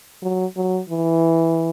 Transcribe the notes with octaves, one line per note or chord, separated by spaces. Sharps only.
F#3
F#3
E3